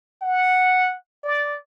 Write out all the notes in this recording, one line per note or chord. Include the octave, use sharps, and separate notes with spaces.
F#5
D5